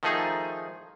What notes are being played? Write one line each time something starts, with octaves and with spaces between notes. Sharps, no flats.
D#3 F3 A3 D#4 G#4